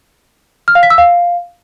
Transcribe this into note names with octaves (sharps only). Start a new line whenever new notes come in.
F6
F5
B6
E6
F5